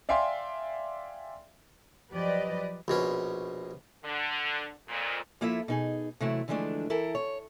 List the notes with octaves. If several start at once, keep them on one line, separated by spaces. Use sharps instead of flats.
D5 E5 F5 G5 G#5 C6
F3 F#3 G4 B4 D5 D#5
A#1 B2 C#4
D3
F2 A#2
F3 A#3 E4 F4 A4 E5
B2 D#4 G#4
C3 E3 F#3 A3 E4
D3 E3 F3 G#3 A3 D4
E3 E4 A4 A#4
C#5